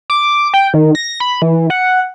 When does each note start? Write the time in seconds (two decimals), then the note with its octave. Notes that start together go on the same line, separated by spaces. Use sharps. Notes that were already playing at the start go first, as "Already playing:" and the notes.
0.10 D6
0.54 G5
0.74 D#3
0.95 A#6
1.20 B5
1.42 E3
1.70 F#5